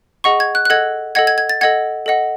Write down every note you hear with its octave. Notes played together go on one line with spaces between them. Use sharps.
G#4 D#5 F#5 C#6
G#6
F#6
F#6
A4 D#5 F#5 G#6
A4 D#5 F#5 G#6
G#6
G#6
A6
A4 D#5 F#5 G#6
A4 D#5 F#5